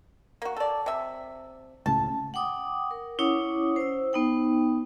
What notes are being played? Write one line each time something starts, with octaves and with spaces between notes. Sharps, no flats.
A#3 F#4
A4 D5
C3 E5
C#2 A2 C#3 A5
F#5 G5 D6 D#6
A#4
C#4 E4 C#5 F#5 D6 D#6
C5 E6
B3 D#4 G5